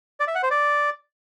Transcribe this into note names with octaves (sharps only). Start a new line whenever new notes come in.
D5
E5
F#5
C5
D5